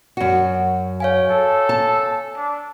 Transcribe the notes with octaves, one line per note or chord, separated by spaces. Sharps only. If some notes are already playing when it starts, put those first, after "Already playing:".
F#2 F#4
C#5 F5 G#5
A4
A5
D4